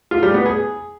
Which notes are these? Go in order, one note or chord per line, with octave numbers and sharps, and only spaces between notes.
F4
G3
B3
G#4